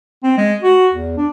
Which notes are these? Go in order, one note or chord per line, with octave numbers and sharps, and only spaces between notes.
C4
G#3
F#4
E2
D4